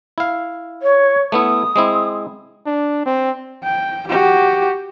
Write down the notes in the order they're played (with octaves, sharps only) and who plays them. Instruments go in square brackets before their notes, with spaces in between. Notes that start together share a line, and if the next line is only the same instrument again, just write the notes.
[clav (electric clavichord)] E4 F5
[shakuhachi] C#5
[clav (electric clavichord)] A3 B3 E4 [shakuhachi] D#6
[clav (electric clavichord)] G#3 C4 E4
[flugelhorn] D4
C4
[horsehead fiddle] G5
F#4 G4